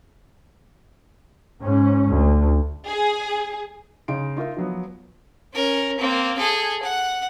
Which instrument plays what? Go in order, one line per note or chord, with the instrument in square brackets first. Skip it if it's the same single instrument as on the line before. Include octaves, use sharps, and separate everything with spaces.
[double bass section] G#2 C#4
D2
[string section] G#4
[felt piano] C#3 D#4 C6 D7
D#4 F4 A#4 E5
F3 F#3 B3
[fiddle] C#4 A#4
A#3 C4
G#4 A4
F#5